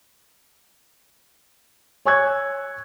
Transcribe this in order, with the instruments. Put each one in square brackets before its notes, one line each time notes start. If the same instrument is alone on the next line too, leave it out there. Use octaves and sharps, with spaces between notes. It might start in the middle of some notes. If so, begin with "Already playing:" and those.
[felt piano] C#5 G#5 C#6 E6 F#6 G#6